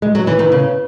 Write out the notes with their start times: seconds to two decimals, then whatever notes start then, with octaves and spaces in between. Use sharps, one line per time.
0.02 G#3
0.15 F#3
0.27 E3
0.39 D#3
0.52 C#3